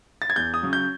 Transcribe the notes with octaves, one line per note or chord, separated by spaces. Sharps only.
A6
G#6
E2 G6
D#6
C#3 F#3
G6